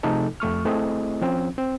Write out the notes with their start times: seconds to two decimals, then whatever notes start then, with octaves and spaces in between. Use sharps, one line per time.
0.03 C3 F3 A3 D#4 G#4 A4
0.40 F2 A3 C#6 F6
0.65 A3 C4 E4 G#4 D#5
1.22 F3 C4 C#4
1.58 C4